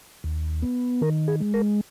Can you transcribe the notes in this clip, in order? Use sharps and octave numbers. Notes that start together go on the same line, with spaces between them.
D#2
B3
D#3 A#4
G#4
G#3
A#4